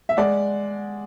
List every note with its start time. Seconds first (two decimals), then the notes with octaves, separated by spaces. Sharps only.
0.09 E5
0.17 G#3 D5 F#5